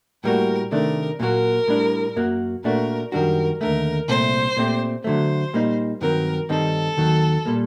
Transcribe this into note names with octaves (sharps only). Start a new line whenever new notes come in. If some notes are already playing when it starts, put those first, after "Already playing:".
A2 G3 A#3 F#4 A#4
C3 D#3 A3 D4 A#4
A#2 F#3 A#3 F#4 A#4
A2 G3 D4
F#2 F#3 A#3 F#4
A#2 A3 D4 F#4 A#4
F#2 D#3 G3 D4 F#4 A#4
D#2 D3 A3 A#4
C2 A#2 A3 C4 C5
A#2 A3 C4 G4
D3 F#3 A3 C5
A#2 G3 A#3 D#4
G2 D#3 F#3 C4 A#4
G2 D#3 G3 C4 D#4 A4
D#2 D#3 F#3
A#2 G3 A#3